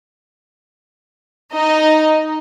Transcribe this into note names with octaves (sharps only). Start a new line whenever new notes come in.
D#4 D#5